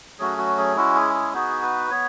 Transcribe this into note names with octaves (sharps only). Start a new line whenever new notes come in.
F#3 A3 C#4 F#4 G#4
F#4
G#4
G#3 C#4 E4 F#4
G#4
G#4
B3 D#4 F#4 G#4
B4
B3 C#5